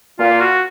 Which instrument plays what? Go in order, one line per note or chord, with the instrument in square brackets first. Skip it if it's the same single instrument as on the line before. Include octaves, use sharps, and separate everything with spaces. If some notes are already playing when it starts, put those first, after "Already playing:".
[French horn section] A#2 [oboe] F4
[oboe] F#4